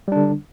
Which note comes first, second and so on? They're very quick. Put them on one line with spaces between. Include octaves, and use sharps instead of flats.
G3 D4 D3